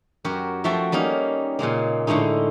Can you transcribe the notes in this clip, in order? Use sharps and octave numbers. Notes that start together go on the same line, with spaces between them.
F#2 F#4 G4 A#4
F3 A3 F#4 E5 G5 A5
G3 A#3 C#4 D#4
A#2 C#3 G#3 A#3
A2 D3 G#3 A3 D#4